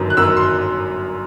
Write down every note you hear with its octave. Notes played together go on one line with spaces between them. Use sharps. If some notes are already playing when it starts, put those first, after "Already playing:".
Already playing: G1 F#2 D#3 F#3
F#6
G1 F#2 D#3 F#3 E6
C6